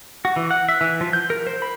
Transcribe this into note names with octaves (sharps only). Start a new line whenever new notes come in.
F#4
E3
F#5
E5
E3
F3
G6
A#4
C5
B5